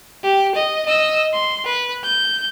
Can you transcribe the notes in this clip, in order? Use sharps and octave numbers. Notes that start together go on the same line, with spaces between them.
G4
D#5
D#5 E6
C6
B4
G6